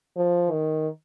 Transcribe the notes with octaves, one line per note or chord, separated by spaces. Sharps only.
F3
D#3